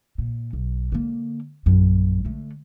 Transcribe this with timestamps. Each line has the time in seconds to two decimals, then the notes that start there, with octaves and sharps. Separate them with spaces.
0.18 A#2
0.53 B1
0.92 D3 A#3
1.66 A#1 F#2
2.25 D3 A3